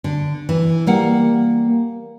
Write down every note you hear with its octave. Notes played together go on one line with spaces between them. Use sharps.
D3
E3
G3 A#3 F#5